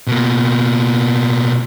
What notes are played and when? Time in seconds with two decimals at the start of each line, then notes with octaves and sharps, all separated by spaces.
0.07 B2 A#3